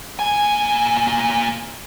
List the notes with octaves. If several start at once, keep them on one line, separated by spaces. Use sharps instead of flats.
A#2 G#5